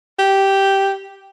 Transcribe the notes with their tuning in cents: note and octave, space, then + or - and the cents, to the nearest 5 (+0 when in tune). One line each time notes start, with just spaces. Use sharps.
G4 -5